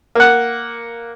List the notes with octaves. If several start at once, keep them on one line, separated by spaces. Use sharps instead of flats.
A#3 F#5